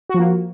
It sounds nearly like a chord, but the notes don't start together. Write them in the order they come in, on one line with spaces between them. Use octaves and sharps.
F#4 F3 A#3